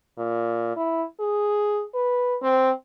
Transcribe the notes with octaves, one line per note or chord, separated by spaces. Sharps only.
A#2
E4
G#4
B4
C4